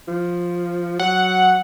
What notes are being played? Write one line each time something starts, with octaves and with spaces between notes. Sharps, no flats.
F3
F#3 F#5